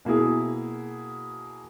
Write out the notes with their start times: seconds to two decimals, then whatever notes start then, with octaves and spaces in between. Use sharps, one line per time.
0.05 B2 A#3 E4 G#4